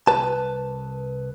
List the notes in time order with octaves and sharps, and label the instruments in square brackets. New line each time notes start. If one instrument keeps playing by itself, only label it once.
[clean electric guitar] C2 B4 A5